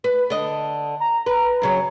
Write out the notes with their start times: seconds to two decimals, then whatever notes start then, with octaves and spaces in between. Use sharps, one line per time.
0.04 B4
0.30 D3 D#5
1.00 A#5
1.26 B4
1.62 F#2 C#3 F#3